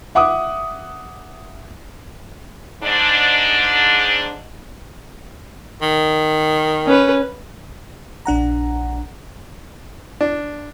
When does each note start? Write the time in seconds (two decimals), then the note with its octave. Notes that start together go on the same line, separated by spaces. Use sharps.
0.15 E5 F#5 D6 D#6
2.83 G#2 D4
5.82 D#3
6.87 C#4 B4
8.25 A#1 D4 F#5 A#5
10.21 D4